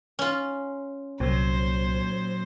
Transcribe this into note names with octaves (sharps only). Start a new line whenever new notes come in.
C#4 F4
C2 A#2 F#3 C5